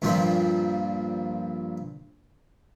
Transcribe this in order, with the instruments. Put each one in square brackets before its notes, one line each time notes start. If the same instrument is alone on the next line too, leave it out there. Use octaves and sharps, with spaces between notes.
[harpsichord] G2 A#2 F3 C4 C6